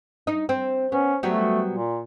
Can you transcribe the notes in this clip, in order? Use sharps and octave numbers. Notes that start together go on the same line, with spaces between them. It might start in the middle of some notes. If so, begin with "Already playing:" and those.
D#4
C4
B3 C#4
F#3 G3 A3 B3
A#2